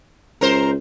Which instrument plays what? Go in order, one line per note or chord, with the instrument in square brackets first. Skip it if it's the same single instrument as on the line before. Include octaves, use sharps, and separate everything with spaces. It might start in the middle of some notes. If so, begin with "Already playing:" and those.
[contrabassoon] C#2 [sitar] A#4 C5